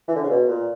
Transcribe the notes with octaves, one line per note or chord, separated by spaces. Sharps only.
E3
D3
C#3
B2
A#2